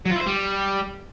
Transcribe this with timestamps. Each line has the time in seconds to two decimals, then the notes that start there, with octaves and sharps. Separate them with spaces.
0.05 F#3
0.11 F4
0.16 E4
0.21 C5
0.26 G3